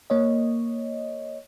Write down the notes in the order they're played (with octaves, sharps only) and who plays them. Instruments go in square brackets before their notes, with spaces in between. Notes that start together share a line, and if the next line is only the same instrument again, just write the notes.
[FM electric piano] A#3 C#5 D#5